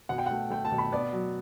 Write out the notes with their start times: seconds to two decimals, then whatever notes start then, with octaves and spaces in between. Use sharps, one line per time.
0.09 B2 F#5
0.18 G5
0.26 A3 F#5
0.50 A3 G5
0.65 A5
0.71 B2
0.78 B5
0.92 B3 D5
1.13 F#3